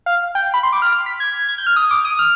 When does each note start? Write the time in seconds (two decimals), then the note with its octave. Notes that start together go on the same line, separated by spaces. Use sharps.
0.06 F5
0.35 G5
0.54 B5
0.63 C6
0.73 D6
0.82 F6
0.92 F6
1.06 B6
1.20 G#6
1.49 G#6
1.58 G6
1.67 F6
1.76 D#6
1.91 D6
2.05 D#6
2.19 F6